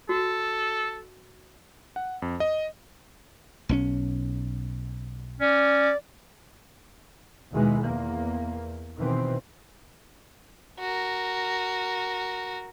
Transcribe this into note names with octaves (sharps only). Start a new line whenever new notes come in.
F#4 A4
F#5
F2
D#5
B1 F3 C#4
C#4 D5
D#2 B2 D#3 E3 G#3
E2 A#3
B2 D#3 E3 C4
F#4 A#4